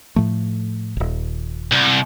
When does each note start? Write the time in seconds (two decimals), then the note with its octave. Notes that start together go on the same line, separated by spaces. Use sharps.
0.16 A2 F3 A3
0.97 D#1 G#1
1.72 C2